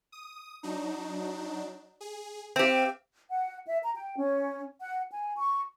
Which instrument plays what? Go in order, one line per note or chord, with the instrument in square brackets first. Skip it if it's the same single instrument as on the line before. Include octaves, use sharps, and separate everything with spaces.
[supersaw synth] D#6
F#3 D4 D#4
G#4
[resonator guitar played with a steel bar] C4 G4 [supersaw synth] E5 F5
[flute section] F#5
E5
A#5
G5
C#4
F#5
G#5
C#6